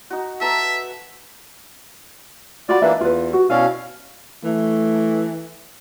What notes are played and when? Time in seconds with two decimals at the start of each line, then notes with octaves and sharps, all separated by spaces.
0.10 D#4 F#4
0.41 A4 B4 E5 A#5
2.69 F4 F#4 D5 B5
2.82 E3 A#3 D4 B4 D#5 E5
3.01 E2 F4 B4
3.33 F#4
3.50 B2 C#4 E4 D5 F5
4.44 E3 A3